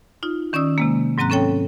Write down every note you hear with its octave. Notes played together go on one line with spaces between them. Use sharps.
D#4 F4
D#3 C#4 D5 D#6 E6
C3 G#3 A#3
G#2 F#3 C4 A#5 F#6
C4 C#4 A4 C#5 G5